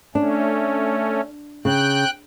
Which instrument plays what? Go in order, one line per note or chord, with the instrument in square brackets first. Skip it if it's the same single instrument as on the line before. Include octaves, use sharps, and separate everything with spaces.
[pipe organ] A3 C#4 [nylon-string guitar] D4
[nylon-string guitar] C#3 [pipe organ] G5 F#6